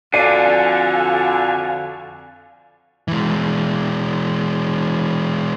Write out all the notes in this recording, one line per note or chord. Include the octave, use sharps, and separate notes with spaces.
F2 D3 F#4 A4 D5 F5 G#5
E3 G#3